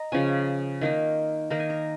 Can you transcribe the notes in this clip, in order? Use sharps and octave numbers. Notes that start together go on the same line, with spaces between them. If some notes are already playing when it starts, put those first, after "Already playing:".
Already playing: D#5 A#5
C#3 F3 C#4 G#5
D#3 A#3 D#4
D#3 A#3 D#4 A#5
G#5
A#5